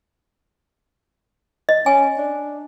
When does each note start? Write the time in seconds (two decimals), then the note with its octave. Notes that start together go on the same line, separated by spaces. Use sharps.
1.69 D#5
1.86 C#4 G#5
2.18 D4